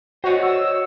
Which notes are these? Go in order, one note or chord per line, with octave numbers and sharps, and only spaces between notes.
F#4 C5 C#5 D#5
E6